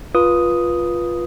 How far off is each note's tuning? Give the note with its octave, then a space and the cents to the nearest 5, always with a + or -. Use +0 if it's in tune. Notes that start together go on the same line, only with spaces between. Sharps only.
F4 +0 B4 -20 D#6 +0